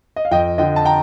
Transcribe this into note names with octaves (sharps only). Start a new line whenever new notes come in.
D#5
F5
F2 D#5 G5
D3 F3 D#5 G5
A5
G5 A#5